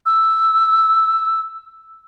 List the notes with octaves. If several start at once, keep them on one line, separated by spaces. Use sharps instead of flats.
E6